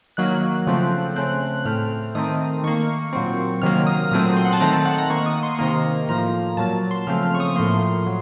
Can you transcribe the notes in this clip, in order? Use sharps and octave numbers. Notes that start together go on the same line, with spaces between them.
D#3 F#3 A#3 F#6
C#3 F3 A3 C4
C#3 A3 C4 F#6
A2 A3 C4 F6
D#3 A3 C4 D#6
D#3 A#3 C#6
A#2 F#3 C4
C3 D#3 F#3 A#3 F6
D#6
A#2 F#3 A3 C4 D#6
C6
F#5
A5
D#3 A3 C4 A#5
A5
F#5
A#5
D#3 A#3 C#6
D#6
C6
C3 D#3 A#3 A#5
A2 F3 A#3 A#5
A#2 F#3 A#3 A5
C6
C#3 F3 A3 C4 F6
F6
C#6
D#6
A2 F3 A#3 C6
A2 F#3